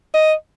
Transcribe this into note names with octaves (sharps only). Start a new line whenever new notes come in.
D#5